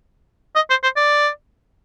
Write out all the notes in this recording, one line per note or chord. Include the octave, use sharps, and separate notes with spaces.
D#5
C5
C5
D5